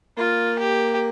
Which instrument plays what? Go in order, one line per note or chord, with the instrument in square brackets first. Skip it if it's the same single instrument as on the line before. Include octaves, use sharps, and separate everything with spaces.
[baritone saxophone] A#3 [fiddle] F4
[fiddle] G4